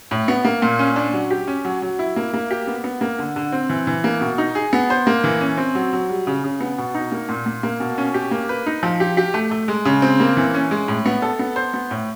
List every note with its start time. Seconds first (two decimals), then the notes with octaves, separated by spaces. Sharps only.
0.11 A2
0.28 B3
0.45 A#3
0.62 A#2
0.79 C#4
0.96 D4
1.13 F#3
1.31 G4
1.48 C#4
1.65 F#3
1.82 F#3
1.99 E4
2.16 A#3
2.34 A#3
2.51 G4
2.67 B3
2.84 B3
3.01 A#3
3.19 D3
3.36 D3
3.53 C4
3.70 E3
3.87 E3
4.04 A#3
4.21 B2
4.38 D#4
4.55 G#4
4.73 B3
4.90 C5
5.07 A#3
5.24 E3
5.41 C#4
5.58 C4
5.75 F#3
5.93 F#3
6.10 G3
6.27 C#3
6.44 C#3
6.61 B3
6.78 B2
6.95 D#4
7.12 A#3
7.29 A#2
7.46 A#2
7.63 A#3
7.80 B2
7.98 C#4
8.14 G4
8.31 A#3
8.49 B4
8.66 D#4
8.83 F3
9.00 G4
9.17 G4
9.34 A3
9.51 A3
9.68 G#3
9.85 C#3
10.02 C4
10.20 A#3
10.37 E3
10.54 C#4
10.71 G#3
10.88 A2
11.06 B3
11.22 A4
11.39 B3
11.56 C5
11.74 B3
11.91 A2